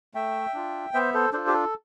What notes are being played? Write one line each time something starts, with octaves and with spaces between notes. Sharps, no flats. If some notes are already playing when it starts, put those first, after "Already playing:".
A3 E5 G5
D4 F4
B3 C5 E5
A4 C5
D4 F4 A4 C5
G4
A4